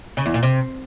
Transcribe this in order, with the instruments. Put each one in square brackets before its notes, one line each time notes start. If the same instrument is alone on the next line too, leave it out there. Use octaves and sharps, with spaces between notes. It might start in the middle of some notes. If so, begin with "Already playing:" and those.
[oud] C#3
E2
A#2
C3